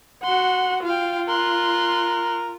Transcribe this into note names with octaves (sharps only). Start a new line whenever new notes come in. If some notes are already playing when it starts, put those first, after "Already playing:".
F#4 F#5 C6
F4 F5 G5
A#4 C6 F#6